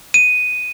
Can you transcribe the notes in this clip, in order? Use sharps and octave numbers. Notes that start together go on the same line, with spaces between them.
D#7